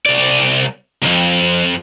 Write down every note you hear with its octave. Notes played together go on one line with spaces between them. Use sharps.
C2 D5
C2 F2